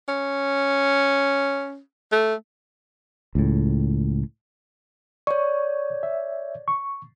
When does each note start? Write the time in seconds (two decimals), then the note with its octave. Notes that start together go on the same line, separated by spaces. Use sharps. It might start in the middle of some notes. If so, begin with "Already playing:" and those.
0.08 C#4
2.12 A3
3.35 C#2 A2
5.27 C#5 D5 C#6
6.03 E5
6.68 C#6